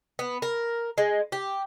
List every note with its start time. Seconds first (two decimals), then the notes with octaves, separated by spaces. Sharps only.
0.19 B3
0.42 A#4
0.98 G#3
1.32 G4